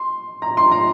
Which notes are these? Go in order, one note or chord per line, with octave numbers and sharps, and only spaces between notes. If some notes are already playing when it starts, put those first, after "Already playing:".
Already playing: C6
A#5
C6
A#5